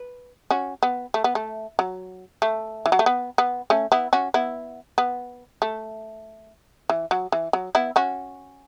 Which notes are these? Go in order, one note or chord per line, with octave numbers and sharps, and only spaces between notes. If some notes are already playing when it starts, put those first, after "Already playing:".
Already playing: B4
C#4 F#4
B3
A3
B3
A3
F#3
A3
E3
F#3
A3
B3
B3
A3 C#4
B3 E4
C#4 F#4
B3 E4
B3
A3
E3
F#3
E3
F#3
B3 E4
C#4 F#4